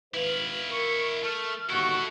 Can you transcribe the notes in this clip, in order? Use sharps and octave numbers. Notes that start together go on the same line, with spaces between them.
G#1 E4 B4 F5 F#7
A#4 C#6
A3 F6
G1 D#2 E4 F#4 A4 C#6